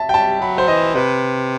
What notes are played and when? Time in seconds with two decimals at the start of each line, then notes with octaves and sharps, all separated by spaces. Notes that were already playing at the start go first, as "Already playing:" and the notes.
Already playing: E5 A5
0.09 G5
0.14 G3 A5
0.41 F#3 B5
0.58 C5
0.68 E3 D#5
0.95 C3 B4